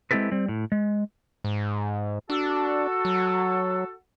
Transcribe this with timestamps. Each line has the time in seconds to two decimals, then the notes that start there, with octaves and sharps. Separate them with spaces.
0.11 G#3 C4 E4 G4 A4 B4
0.31 G3 C4
0.48 A2
0.72 G#3
1.44 G#2
2.30 D4 F#4 A4
3.05 F#3